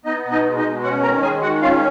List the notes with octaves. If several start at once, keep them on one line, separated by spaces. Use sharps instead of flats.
B3 D#4 D#5
B2
D#4 D#5
G#3
D#4 D#5
B2
C#4 F#4 F#5
D#3 A#4 A#5
G#3 G#4 G#5
D#3 F#4 F#5
C#4 F4 F5